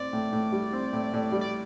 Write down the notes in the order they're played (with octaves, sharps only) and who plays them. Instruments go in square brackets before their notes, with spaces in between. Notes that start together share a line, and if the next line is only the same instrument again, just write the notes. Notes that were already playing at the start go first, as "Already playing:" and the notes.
Already playing: [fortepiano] A2 C4 [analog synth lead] D5
[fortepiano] A2
A2
G3
C4
A2
A2
G3
[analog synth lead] D5